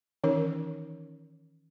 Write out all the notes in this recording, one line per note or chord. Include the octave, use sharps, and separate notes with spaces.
D#3 E3 C#4 D#4 A#4 C#5